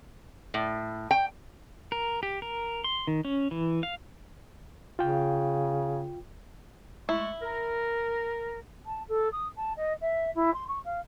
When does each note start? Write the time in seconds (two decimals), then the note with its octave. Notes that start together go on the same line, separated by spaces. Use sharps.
0.54 A2
1.11 G5
1.92 A#4
2.23 G4
2.42 A#4
2.84 C6
3.07 D#3
3.25 C#4
3.51 E3
3.83 F5
4.99 C#3 F4 G5
7.09 G#3 A3 E4 C#6
7.42 A#4
8.86 A5
9.08 A4
9.32 D#6
9.57 A5
9.77 D#5
10.01 E5
10.35 E4
10.54 C6
10.68 C#6
10.85 F5